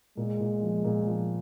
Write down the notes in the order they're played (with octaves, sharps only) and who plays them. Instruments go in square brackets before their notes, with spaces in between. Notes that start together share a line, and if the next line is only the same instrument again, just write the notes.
[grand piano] A#2 [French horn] G#3
[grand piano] A#2
F3
A#2
F3